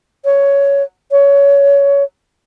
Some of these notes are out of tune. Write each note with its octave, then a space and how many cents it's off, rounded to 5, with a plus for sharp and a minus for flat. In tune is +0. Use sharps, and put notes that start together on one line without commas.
C#5 +10
C#5 +20